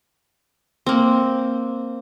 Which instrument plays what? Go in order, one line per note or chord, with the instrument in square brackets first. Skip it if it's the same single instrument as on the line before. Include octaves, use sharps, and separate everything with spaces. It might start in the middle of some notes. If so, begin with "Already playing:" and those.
[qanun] A#3 C4